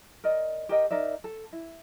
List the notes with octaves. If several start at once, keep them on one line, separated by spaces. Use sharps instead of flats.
A#4 D5 D#5
G4 A#4 D#5 G5
D#4 A#4 D5 E5
A4
E4